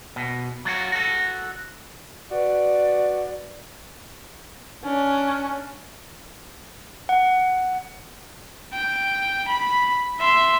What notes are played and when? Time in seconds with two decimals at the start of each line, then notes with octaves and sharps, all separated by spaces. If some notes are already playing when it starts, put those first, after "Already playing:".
0.16 B2
0.65 F#3 F4 F#4
0.92 F#4 A4
2.30 F#4 B4 D5
4.84 C#4 D4
7.09 F#5
8.74 G5
9.48 B5
10.20 E5 C6